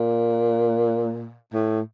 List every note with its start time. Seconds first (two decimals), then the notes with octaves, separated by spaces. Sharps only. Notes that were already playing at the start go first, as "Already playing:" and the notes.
Already playing: A#2
1.53 A2